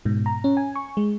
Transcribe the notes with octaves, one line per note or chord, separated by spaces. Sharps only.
G#2 B2
A#5
C#4
G#5
C#6
G#3